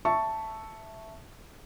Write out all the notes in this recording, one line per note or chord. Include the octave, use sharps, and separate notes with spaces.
E5 A5 C#6